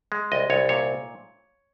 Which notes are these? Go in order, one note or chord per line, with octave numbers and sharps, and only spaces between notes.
G#3
C2 D#5
C2 C#5
A#2 C#5